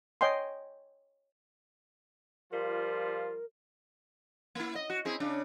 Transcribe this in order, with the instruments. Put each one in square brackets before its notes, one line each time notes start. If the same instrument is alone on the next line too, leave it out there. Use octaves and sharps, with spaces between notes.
[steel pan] C#5 D#5 G5 G#5 C6
[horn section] F3 G3 F4 [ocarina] A#4
[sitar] A#3 E4
D#5
F#4
C4 E4 G#4
C#3 D4